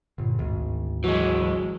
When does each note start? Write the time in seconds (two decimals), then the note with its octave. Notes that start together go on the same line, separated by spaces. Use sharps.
0.18 G1 A#2
0.39 G#1 D2
1.04 E3 F#3 G#3